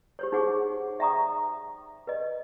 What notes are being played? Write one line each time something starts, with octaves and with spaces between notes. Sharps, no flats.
G4 C5 C#5
D#4 G#4 C5 F#5 C#6 D6
D5 E5 G5 A#5 C#6 D#6
B4 D5 D#5